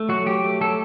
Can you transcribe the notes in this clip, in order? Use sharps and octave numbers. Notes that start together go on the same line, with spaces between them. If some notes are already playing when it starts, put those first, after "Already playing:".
Already playing: A3
F#3 F#4
F#3 G4
A3
F#3 A4